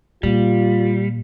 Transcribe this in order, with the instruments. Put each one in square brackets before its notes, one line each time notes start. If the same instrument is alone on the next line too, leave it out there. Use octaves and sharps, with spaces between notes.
[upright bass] A#2 [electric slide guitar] G3 [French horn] F4